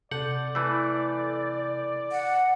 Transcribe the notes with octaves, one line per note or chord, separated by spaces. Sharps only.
C3 A4 D5 F#5 G6
E3 A3
F#5